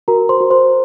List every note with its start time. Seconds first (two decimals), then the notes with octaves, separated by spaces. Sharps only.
0.08 F#4 A#4 A#5
0.29 C5 C6
0.40 F#4
0.51 C5 C6